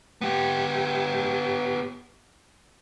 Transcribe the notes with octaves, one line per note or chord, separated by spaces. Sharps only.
B3 G4